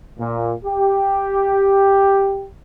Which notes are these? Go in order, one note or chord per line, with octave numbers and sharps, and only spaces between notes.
A#2
G4